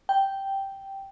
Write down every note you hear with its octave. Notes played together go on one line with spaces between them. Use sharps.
G5